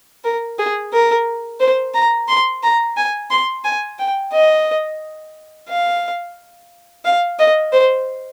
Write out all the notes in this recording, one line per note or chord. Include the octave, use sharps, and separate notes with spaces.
A#4
G#4
A#4
C5
A#5
C6
A#5
G#5
C6
G#5
G5
D#5
F5
F5
D#5
C5